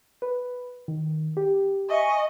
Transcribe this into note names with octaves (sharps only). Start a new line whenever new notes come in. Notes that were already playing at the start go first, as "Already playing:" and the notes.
B4
D#3
G4
D#5 E5 G#5 C#6